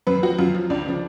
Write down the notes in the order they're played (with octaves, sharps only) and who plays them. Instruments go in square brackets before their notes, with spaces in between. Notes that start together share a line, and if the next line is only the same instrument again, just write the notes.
[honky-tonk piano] F#2 B4
F3 F#4
F#2 F4
F3 F4
C#2 D4
C#3 F3